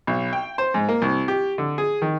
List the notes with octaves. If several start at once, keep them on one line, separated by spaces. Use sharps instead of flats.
B1
G5
C5
G#2
A#3
C2
G4
D3
G#4
D#3